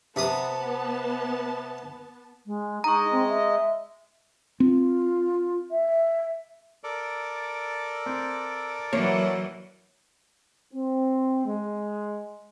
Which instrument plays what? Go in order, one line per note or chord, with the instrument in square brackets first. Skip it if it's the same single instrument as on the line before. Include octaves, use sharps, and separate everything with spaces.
[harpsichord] C3 D#6 [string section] B3 A5
[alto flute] G#3
[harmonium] G#3 D#5 [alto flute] D#4 [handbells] A#5 C#6
[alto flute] C4
E5
[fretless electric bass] C4 [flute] F4
[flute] E5
[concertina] A4 A#4 D5
[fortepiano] C4
[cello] E3 F#3 [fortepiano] A#3 [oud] C#5
[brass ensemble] C4
G#3